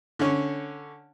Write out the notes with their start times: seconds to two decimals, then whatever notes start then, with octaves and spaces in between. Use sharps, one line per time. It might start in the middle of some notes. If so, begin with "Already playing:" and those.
0.19 D3 C#4